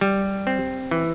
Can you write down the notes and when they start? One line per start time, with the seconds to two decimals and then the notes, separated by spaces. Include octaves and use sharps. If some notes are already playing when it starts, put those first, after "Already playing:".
0.01 G3
0.47 C4
0.91 E3